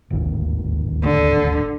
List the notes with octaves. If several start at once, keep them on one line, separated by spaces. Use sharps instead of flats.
D1 G#1 D#2
D3